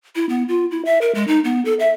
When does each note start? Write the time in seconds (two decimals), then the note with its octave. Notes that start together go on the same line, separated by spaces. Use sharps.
0.16 E4
0.29 B3
0.48 F4
0.71 E4
0.85 E5
1.01 A#4
1.15 G#3
1.28 D#4
1.44 B3
1.65 A4
1.80 E5